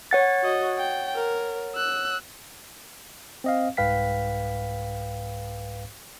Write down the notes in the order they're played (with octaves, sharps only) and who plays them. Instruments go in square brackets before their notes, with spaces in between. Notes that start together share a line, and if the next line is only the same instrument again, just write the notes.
[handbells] C#5 F#5 A6
[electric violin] F#4 D#5
G5
A#4
E6 F#6
[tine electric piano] C4 D#5 F5
C2 G#2 B4 F5 G5 B6